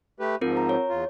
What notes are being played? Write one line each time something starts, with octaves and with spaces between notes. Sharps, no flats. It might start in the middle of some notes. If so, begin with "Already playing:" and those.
A3 G4 B4
G#2 F3 C4 F4 A#4
A#5
C#5
E2 F4